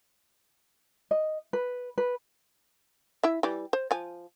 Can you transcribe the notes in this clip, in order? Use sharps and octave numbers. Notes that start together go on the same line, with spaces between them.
D#5
B4
B4
E4 E5
E3 G3
C5
F3 G#5